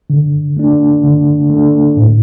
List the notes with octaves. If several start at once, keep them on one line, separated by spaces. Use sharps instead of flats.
D3
A3 D4
D3
A3 D4
A2